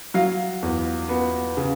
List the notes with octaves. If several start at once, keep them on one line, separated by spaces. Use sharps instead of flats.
F#3 F5
E2
B3
C#3